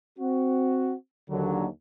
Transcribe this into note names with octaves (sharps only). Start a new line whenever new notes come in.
C4 F#4
D#2 D3 F#3